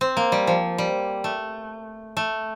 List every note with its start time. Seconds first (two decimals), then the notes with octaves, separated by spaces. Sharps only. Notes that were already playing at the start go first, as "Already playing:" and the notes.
0.01 C4
0.17 A#3
0.32 G3
0.47 F3
0.78 G3
1.24 A3
2.17 A3